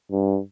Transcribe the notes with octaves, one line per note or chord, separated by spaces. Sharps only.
G2